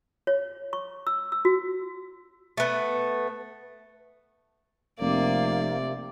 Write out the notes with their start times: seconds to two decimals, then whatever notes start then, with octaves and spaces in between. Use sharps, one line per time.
0.27 C#5
0.73 C#6
1.07 E6
1.32 E6
1.45 F#4
2.57 A3 B3
5.00 F1 C3 A#3 D5